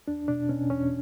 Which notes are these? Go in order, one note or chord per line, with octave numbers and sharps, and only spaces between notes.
E2 D4
B2 D4
B2 C#4
E2 C#4